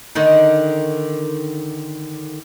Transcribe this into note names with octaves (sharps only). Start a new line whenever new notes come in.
D3 D#3 D#4